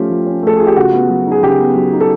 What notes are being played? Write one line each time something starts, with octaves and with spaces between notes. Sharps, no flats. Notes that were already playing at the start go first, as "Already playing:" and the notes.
Already playing: F3 A3 C#4 F4 G4
F3
C#4
A3 A4
F4 G#4
G4
C#3 F#4
B3
F#3
D#4
G#4
C#3 G4
B3
F#3
D#4
A4